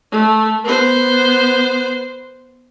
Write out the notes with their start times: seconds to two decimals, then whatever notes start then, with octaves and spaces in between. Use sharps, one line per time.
0.12 A3
0.64 B3 C5